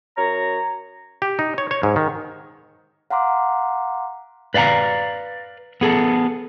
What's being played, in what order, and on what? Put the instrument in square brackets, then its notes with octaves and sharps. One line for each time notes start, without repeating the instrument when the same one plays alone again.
[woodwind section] F#2 C#5 A#5
[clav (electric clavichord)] G4
D#4
C#5
C#5
G#2
D#3
[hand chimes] F5 F#5 A#5 C6 D6
[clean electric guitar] B4 D5 F5 G5 A#5
B3 G#4 A4